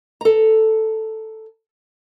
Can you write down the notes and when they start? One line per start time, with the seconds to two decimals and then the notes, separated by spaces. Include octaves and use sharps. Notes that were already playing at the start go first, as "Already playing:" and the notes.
0.21 A4 A#5